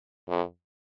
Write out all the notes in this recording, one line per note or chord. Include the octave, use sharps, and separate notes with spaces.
F2